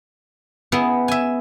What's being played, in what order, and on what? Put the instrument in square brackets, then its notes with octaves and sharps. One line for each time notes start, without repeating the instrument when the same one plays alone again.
[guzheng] B3 E4 G#4
E5 G#5